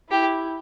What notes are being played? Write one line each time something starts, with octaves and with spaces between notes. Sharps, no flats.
E4 G4